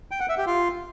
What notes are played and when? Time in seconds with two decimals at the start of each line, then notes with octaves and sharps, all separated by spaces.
0.11 G5
0.20 F#5
0.29 E5
0.38 G4
0.47 F4